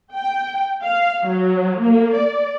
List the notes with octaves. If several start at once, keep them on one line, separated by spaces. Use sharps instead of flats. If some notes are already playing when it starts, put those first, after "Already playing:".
G5
F5
F#3
A#3
D5